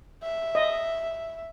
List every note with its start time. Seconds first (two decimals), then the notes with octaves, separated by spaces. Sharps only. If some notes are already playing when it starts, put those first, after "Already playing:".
0.23 E5
0.55 D#5